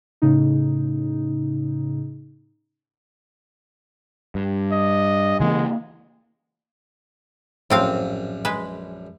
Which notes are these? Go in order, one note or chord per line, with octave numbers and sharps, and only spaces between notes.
A2 C#3 D#4
G2
D#5
C#3 E3 G#3 A#3
A#1 F#2 A2 C4 F5
G#3 B4